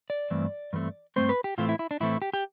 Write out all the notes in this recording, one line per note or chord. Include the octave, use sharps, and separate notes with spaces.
D5
G2 E3 A3 C4
G2 E3 A3 C4
G2 E3 A3 C4 C5
B4
G4
A2 E3 A3 C4 F4
E4
E4
D4
A2 E3 A3 C4 E4
G4
G4